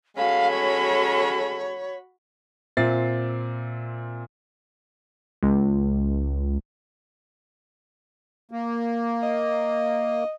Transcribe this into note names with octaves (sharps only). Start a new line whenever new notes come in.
G#3 C#4 F#4 A4 F5 B5
C#5
A#2 C4 E5 A6 C7
C#2
A#3
D#5